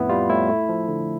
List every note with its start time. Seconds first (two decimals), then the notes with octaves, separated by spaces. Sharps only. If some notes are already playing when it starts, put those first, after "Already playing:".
Already playing: F2 A2 B3 E4
0.09 G3 F4
0.29 A2 E4
0.49 A3
0.69 F3
0.88 D3